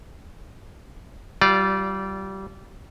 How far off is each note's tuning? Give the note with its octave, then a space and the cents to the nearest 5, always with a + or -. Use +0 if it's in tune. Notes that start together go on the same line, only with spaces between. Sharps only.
G3 -25 F4 +0 D5 -5